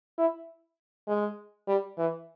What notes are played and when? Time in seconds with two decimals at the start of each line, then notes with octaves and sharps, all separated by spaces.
0.18 E4
1.08 G#3
1.68 G3
1.98 E3